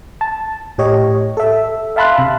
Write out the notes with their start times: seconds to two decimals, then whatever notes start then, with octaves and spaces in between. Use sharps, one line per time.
0.21 A5
0.78 A2 G4 C#5 D#5
1.37 A4 E5
1.96 E5 F5 A5 B5 C6 F#6
2.18 C3